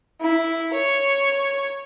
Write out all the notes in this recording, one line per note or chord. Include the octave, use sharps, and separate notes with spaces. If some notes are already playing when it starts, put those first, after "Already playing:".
E4
C#5